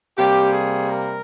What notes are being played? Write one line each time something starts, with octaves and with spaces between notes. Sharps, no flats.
C3 G3 A#3 G4
G#4
A#4